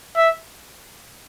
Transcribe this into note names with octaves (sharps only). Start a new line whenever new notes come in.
E5